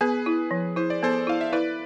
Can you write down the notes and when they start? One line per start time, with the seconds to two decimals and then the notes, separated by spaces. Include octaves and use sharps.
0.01 B3 G#4 B4
0.26 E4
0.51 F3
0.76 E4 C5
0.90 D5
1.03 B3 A4 C5
1.27 E4 F5
1.41 E5
1.53 E4 B4 D5